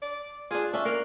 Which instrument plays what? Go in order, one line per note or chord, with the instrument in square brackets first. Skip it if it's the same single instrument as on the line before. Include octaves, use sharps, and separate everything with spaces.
[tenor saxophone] D5
[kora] D4 F4 [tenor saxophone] G#4
[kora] C#4 D4 [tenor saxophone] E5
[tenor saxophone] A#3 [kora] A#4